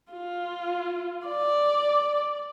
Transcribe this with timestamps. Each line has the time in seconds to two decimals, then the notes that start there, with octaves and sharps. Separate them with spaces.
0.12 F4
1.27 D5